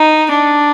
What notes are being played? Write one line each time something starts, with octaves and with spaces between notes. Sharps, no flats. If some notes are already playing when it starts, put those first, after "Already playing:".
Already playing: D#4
D4